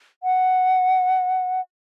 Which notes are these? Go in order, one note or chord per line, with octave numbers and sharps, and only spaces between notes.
F#5